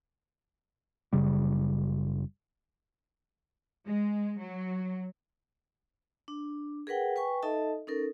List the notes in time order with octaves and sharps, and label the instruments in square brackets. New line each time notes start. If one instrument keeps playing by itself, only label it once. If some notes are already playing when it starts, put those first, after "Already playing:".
[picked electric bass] F#1 C#3 G3
[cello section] G#3
F#3
[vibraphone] D4
G#4 A#4 B4 F#5 G5
B4 G5 G#5 C#6
D#4 A4 D#5 E5 A5
C#4 D#4 A4 A#4